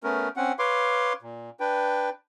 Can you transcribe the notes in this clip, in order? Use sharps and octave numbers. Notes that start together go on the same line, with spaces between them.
A3 B3 C#4 A#4
C4 C#4 F#5
B4 C#5 F5 C6 D6
A#2
D4 B4 G5